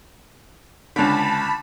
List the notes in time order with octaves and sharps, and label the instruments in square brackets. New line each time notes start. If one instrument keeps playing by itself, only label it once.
[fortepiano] C#2 D3 [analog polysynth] A5 B5